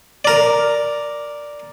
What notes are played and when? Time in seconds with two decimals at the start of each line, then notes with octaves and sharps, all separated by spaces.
0.25 A#4 D5